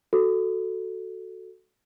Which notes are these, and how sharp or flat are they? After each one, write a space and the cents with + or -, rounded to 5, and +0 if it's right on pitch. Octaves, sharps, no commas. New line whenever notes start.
F#4 +0 A4 +0